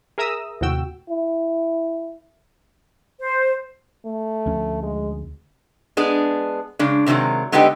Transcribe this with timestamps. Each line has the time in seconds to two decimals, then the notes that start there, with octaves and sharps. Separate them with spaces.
0.18 G#4 A#4 E5 A#5 D#6 E6
0.61 D#2 A2 C3 F#4 G5 E6
1.09 E4
3.20 C5
4.05 A3
4.46 D2 F3 C#4
4.83 G#3
5.97 G#3 B3 D4 G#4
6.79 C#3 G#3 D4
7.06 A2 C3 D#3 F#3 G#3
7.52 D3 G#3 B3 D#4 G4 G5